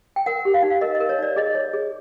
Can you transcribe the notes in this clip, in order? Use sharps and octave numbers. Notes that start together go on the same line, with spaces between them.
G5
A#4 F#5
G4
F5
D#4 F#5
F5
A#4 D#5
D#5
A#4
C#5
D#4 D5
G#4 D#5
C#5
G#4